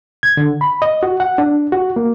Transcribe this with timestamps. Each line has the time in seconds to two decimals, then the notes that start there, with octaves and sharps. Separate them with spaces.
0.23 G#6
0.37 D3
0.61 B5
0.82 D#5
1.03 F#4
1.20 F#5
1.38 D4
1.72 F#4
1.96 A#3